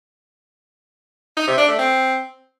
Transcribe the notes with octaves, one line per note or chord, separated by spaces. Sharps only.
D#4
C3
D4
A3
C4